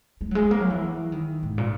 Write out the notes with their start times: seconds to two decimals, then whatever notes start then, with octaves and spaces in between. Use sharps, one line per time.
0.21 G#3
0.31 F#3
0.35 G#3
0.51 A#3
0.60 F#3
0.71 E3
1.12 D#3
1.43 G#2
1.58 A#2